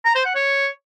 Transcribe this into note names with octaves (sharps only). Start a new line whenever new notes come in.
A#5
C5
F#5
C#5